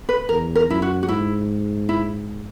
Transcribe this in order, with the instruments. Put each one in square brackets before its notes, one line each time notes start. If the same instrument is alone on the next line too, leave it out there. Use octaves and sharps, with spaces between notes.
[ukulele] B4
[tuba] E2 [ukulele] A#4
[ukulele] A#4
[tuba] F#2 [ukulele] E4
[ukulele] F#4
F#4
[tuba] G#2 [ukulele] E4
[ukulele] E4